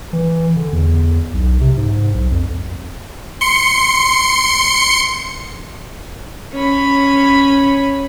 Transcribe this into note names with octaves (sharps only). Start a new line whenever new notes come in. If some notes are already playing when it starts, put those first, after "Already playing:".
E3
D3
E2
B1
C3
G#2
B1
F2
C6 C#7
C#4 B5